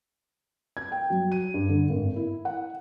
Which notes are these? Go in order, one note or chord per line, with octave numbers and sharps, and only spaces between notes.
G#6
G5
F#3
D#7
G2
D3
G#1
E4
F#5